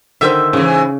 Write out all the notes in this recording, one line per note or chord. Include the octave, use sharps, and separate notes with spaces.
D3 D#3 C5 E5
G#2 C#3 E3